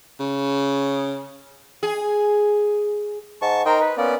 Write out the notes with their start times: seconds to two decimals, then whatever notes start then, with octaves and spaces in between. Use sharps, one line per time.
0.20 C#3
1.83 G#4
3.42 G#2 A5 C#6
3.66 D#4 A#4 C5 G5
3.81 B4
3.97 A#3 B3 C#4 D5